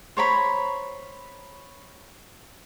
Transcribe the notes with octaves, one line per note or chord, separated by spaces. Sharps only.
C5 C#5 A#5 B5